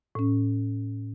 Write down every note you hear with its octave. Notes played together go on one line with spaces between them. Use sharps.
A2 C#4